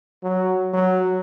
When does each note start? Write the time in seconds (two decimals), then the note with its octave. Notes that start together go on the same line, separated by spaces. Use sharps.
0.24 F#3
0.73 F#3